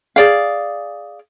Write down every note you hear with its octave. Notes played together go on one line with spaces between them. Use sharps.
G#4 D5 F5